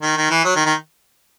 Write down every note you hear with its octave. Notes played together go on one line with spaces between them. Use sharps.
D#3
D#3
E3
F#3
D#3
D#3